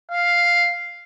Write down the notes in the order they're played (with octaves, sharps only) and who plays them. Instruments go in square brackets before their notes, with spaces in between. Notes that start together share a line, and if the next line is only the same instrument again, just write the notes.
[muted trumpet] F5